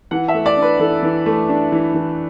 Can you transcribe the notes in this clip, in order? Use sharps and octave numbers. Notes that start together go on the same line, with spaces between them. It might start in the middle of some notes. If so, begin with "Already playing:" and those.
E3 F#5
E5
A3
D5
D4
B4
E3 A4
E3
A3
D4
E3
E3